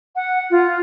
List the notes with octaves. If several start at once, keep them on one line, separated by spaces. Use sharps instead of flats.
F#5
F4